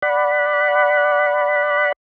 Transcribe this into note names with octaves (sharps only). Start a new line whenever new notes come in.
D5 F#5 B5